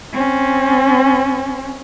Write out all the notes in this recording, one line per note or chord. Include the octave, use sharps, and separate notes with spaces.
C4 C#4